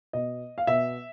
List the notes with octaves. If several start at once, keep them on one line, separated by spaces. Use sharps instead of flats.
B2 D#5
F5
B2 E5